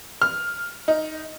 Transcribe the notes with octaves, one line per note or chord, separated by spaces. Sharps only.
F6
D#4